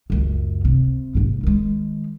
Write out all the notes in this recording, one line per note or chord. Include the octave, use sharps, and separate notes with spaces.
C#2 F#2
C3
A#1 G#2
D#3 G#3